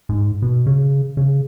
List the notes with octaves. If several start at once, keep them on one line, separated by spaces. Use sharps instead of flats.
G#2
B2
C#3
C#3